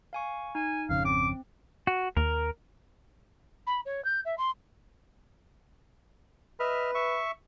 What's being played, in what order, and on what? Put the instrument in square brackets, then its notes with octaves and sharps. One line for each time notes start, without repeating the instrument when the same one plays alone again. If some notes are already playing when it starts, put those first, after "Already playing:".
[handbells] F5 G#5 C#6
[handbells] D#4 [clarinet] G#5
[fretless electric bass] G#1 F2 C#3 [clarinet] F5
[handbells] C4 [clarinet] D6
[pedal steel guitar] F#4
[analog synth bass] D#2 [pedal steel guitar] A#4
[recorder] B5
C#5
G6
E5
C6
[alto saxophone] B4 [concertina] D#5 E5 F6
[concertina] E5 C#6